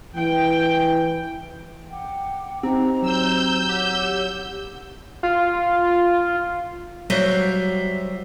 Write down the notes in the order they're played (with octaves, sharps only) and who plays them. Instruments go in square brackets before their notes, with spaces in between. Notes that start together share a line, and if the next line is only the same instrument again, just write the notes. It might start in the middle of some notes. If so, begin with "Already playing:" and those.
[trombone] E3 [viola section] G5
[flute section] F#5 G5 D6
[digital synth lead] C4 [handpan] D#4 G4 [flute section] C5 A#5
[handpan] F#3 [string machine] E6 G6
[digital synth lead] G4 [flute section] C#5 F#5
[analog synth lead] F4
[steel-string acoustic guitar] F#3 G3 F#4 C5 E5 F5